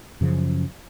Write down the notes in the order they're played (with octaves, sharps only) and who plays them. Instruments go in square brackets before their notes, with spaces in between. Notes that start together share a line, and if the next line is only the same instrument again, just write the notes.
[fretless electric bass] F#2 C#3 F3